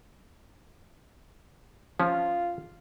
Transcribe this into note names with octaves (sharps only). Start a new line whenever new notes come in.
F3 C#4 F4